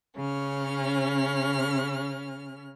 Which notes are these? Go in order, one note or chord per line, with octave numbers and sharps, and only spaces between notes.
C#3 C#4 F6